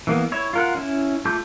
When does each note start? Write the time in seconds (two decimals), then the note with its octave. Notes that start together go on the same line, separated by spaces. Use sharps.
0.07 E3 A#3 B3
0.32 E4 C#5
0.53 F4 A#4 F#5
0.75 C#4 E4
1.25 A3 F4 A5 D6 G6